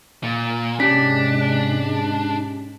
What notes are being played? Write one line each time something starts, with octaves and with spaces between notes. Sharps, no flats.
A#2
G#2 C3 G#3 C#4 D4 G4 B6